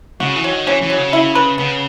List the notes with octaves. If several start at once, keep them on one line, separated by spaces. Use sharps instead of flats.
C#3 F#4
E3
F#3
D#3
E3 C#4
E3
F#3
C#3
E4
B4
C#3 B3